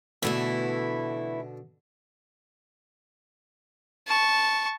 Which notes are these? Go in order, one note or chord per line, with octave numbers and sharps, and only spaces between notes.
B2 D3 E3 A3 E4
A5 C#6